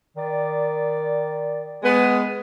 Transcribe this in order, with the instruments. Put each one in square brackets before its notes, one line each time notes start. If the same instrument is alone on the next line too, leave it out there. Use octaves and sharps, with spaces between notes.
[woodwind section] D#3 D5
[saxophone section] G#3 B3